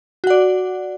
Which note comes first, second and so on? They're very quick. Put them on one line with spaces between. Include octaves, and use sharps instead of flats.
F#4 F#5 D5